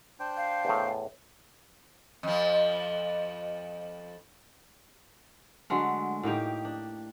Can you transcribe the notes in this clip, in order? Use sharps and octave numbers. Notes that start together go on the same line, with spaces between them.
D4 C5 G5
F5
E2 A2
F2 F3
D3 F#3 G#3 A3
A2 A#3 D#4 G4
D4